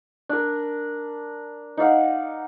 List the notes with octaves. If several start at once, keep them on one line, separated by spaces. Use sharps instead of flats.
D4 A#4
D#4 D5 F5 F#5